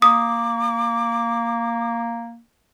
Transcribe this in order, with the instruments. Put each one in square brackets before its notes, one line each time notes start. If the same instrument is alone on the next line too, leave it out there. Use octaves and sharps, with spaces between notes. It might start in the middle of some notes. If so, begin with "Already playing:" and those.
[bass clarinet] A#3 [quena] D6 [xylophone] D#6